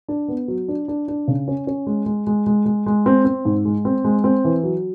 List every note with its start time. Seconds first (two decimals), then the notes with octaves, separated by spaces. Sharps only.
0.08 D4
0.28 B3
0.48 F#3
0.68 D4
0.88 D4
1.08 D4
1.28 C#3
1.48 C#4
1.67 C#4
1.87 G#3
2.06 G#3
2.27 G#3
2.46 G#3
2.66 G#3
2.86 G#3
3.06 C4
3.25 C4
3.45 G#2
3.65 G#3
3.85 C4
4.04 G#3
4.24 C4
4.44 E3
4.64 F#3